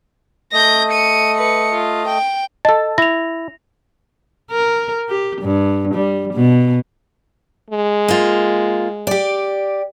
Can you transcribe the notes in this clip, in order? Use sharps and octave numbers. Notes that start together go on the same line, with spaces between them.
A3 D#5 G6 A#6
C#7 D#7
B4 C#7
F4
G5
A4 D#5 A5
E4 A#6 F7
A#4
G4
G2
G3
B2
G#3
A#3 F4
G4 D5